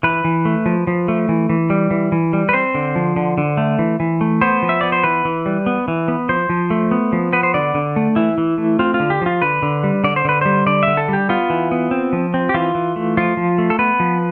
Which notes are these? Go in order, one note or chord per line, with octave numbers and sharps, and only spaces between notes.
E3 B4
E3
A3
F3
F3
A3
E3
E3
G3
E3
E3
G3
B4
C4 C5
D3
F3
D3
D3
A3
E3
E3
A3
B3 C5
F3
E5
B3 D5
C5
E3 B4
E3
G3
B3
E3
B3
F3 C5
F3
A3
B3
F3
B3 B4
C5
D3 D5
D3
A3
E3 E4
E3
A3
C4 F4
F4
D3
G4
F3 F4
D3 B4
D3
G3
D3 D5
C5
D3 B4
G3 C5
D3 D5
D3 E5
A4
G3 G4
B3 F4
E3
B3
C4
F3
C4
G4
E3 F4
E3
A3
F3 F4
F3
A3
A4
B3 B4
F3